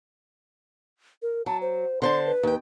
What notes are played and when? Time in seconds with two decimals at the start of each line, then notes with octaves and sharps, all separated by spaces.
1.22 A#4
1.46 F#3 A5
1.61 C5
2.02 D3 C5 A5 C6
2.26 B4
2.43 D#2 G5